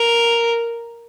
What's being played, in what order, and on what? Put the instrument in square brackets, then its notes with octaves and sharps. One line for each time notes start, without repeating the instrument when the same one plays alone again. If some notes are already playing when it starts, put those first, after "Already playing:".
Already playing: [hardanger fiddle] A#4